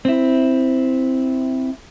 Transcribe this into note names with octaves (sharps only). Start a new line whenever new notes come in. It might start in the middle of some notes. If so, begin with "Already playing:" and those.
C4 E4